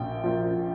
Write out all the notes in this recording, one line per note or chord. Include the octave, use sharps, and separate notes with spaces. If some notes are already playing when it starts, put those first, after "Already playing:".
Already playing: A#1 A#2 G5
A#2 F3